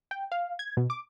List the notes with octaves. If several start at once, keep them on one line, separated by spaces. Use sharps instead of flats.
G5
F5
G#6
B2
D6